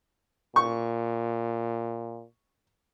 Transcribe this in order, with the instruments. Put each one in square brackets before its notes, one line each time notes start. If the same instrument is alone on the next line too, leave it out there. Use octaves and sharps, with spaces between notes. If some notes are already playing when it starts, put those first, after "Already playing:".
[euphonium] A#2 [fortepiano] C#6